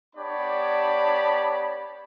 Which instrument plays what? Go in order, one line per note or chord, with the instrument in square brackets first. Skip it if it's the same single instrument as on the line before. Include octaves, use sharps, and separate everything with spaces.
[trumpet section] B3 D4 G4 C#5 D5 B5